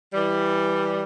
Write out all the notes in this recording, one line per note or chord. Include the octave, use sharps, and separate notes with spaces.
E3 G3